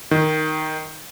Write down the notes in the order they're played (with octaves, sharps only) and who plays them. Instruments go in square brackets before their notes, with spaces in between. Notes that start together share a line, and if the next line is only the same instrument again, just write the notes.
[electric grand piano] D#3